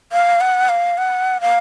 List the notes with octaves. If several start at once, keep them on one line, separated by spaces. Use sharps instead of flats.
F5
F#5
F5
F#5
F5